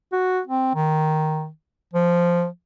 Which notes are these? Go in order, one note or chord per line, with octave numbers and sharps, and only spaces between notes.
F#4
C4
D#3
F3